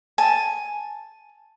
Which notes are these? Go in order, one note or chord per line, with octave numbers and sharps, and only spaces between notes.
G#5 A5